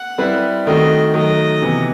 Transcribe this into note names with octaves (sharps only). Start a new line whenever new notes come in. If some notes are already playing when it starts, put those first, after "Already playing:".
Already playing: F#5
G3 C4 E4 B4
D#3 A3 C4 F#4 D#5
D#3 F#3 A3 D#5
C3 E3 B3